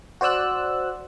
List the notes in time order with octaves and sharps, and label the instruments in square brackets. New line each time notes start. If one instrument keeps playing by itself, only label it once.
[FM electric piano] F#4 C5 D5 E6 F#6